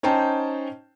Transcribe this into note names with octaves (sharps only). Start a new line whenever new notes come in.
C#4 D#4 C5 G5 A5